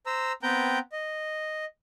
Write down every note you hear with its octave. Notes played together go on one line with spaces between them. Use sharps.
C5 A#5 E6
B3 C4 B4 G5 A#5 G6
D#5